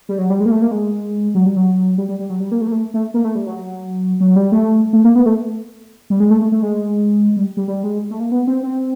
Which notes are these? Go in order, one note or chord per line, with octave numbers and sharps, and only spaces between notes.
G3
F#3
G3
G#3
A#3
A3
A#3
G#3
F#3
G3
F#3
G3
G3
G3
F#3
G3
A#3
A3
A#3
A3
A3
A#3
A3
G3
F#3
F#3
G3
A3
A3
A#3
B3
A3
G3
G#3
A3
A3
A3
G#3
G3
G3
G3
G#3
A3
A#3
B3
C4
C4